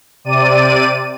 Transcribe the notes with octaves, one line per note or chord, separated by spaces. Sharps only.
C3 D5 D#7